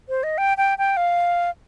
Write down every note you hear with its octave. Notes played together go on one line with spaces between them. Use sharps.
C5
D#5
G5
G5
G5
F5